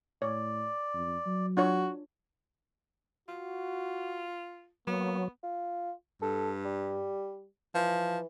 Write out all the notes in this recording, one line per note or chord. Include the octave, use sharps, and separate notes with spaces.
A2 C#5 D5
F2
F#3
D4 F4 F#4 C#5
F4 F#4
F#3 A#3 B3
F4
G2 A4
G3
E3 F3